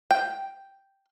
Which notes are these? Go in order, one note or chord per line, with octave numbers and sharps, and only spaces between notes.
G5